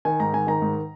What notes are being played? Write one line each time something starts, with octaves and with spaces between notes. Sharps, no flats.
D#3 G#5
G#2 A#5
D#3 G#5
D#3 A#5
G#2